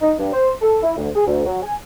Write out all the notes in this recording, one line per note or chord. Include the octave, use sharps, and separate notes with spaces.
D#4
G2
C5
A4
E4
D2
G#4
D2
F#3
G#5